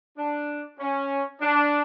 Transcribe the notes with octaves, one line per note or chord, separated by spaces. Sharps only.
D4
C#4
D4